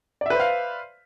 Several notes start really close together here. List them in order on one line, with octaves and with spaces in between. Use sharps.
D5 E5 B4 C5 F5